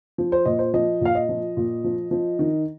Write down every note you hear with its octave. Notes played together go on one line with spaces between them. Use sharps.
F3
C5
A#2 D#5
C5
F3 D#5
A#2 F5
D#5
F3
A#2
F3
F3
D#3